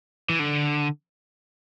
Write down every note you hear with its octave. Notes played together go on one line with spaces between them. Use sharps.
E3
D3